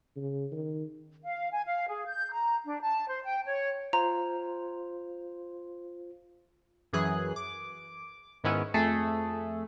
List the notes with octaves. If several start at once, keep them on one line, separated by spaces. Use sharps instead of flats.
C#3
D#3
F5
G#5
F5
G#4
G6
A#5
D4
A5
C5
G5
C#5
F4 C5 A#5
F#2 E3 G#4 F#6
D6
G#2 D#3 G#3 B3 C#4 E4
F2 A3 G#4 A4